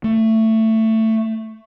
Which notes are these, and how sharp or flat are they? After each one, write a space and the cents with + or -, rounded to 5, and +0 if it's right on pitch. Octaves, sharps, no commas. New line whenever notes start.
A3 +15